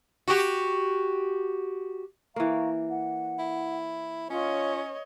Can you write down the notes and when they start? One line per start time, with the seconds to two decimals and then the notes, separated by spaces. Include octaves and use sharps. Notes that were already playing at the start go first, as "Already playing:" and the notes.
0.28 F#4 G4
2.36 E3 A#3 F5 A#5 C#6
2.89 F#5
3.39 E4
4.30 C#4 F4 C#5 D#5